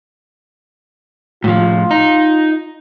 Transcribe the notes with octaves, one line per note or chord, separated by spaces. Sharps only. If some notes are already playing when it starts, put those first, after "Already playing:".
A2 F3 F4
D#4